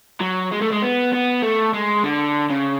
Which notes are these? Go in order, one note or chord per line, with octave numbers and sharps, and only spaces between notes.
F#3
G#3
A3
G#3
B3
B3
A3
G#3
D3
C#3